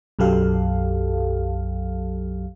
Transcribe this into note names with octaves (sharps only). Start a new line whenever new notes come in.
B1 F#2 F#3 G4 A4 F5